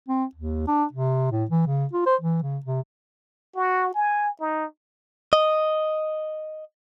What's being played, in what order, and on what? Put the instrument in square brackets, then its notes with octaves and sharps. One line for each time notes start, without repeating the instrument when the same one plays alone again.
[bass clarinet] C4
D#2
D4
C3
A2
E3
C#3
F4
C5
E3
C#3
C3
[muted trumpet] F#4
G#5
D#4
[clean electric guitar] D#5